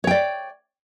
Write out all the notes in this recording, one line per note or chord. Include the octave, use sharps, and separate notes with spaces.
C#5 D5 G5